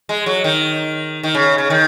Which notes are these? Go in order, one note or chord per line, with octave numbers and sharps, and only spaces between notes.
G#3
F#3
D#3
D#3
C#3
C#3
D#3